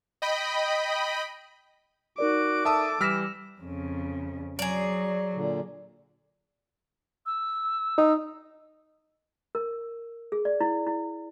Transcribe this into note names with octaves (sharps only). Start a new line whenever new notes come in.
D#5 G5 B5
D#4 F#4 A#4 D5 D6
A4 E5 A5 D#6
E3 G3 E6 F6 A#6 B6 E7
F2 C#3
F#3 G#4 D5
A#2 D3
E6
D#4
A#4
G#4
D5
E4
E4